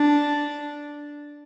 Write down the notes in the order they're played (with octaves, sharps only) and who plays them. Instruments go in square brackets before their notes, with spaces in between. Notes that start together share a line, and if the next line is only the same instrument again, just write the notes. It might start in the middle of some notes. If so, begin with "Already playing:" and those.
Already playing: [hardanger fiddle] D4